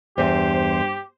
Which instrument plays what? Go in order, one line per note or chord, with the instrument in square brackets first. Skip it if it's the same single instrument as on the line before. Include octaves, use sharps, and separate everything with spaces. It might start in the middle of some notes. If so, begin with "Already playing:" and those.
[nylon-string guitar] E2 E5 [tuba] G2 [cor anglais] G4 [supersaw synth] C5